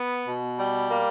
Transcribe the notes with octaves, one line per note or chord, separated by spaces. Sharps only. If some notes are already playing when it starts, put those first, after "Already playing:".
Already playing: B3
B2
G3
A#3